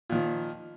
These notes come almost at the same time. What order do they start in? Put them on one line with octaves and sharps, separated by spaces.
A#2 D#3 F3